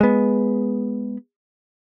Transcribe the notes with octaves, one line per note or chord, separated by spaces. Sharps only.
G#3 B3